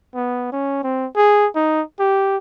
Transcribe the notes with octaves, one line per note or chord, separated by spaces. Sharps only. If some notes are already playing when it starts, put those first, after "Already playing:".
B3
C#4
C4
G#4
D#4
G4